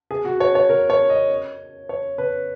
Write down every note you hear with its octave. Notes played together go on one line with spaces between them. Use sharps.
G#4
F#4
C#5
C#5
A#4
C#5
D#5
C#5
B4